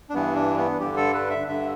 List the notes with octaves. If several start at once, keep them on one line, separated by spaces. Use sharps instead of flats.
D4
G2 E3 B3
D4
B3
G2 D3 G4
A4
B4
E5
G2 D3 E5